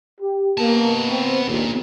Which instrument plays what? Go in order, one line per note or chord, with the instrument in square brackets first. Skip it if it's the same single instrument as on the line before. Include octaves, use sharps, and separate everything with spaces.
[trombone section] G4
[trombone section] A#3 [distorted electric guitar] B3 A5
[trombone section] C4
[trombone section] A#1 D#2 [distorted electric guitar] A#2